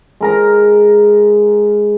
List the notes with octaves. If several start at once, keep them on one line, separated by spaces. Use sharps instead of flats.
G#3 A#4 A#5